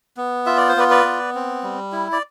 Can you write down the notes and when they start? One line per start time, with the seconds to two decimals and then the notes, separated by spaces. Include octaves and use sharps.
0.17 B3
0.46 F4 E5
0.57 D5
0.69 C5
0.76 B3 B4 D5
0.90 B4 D5
1.05 B3
1.35 C4
1.63 G3
1.92 E4
2.12 D5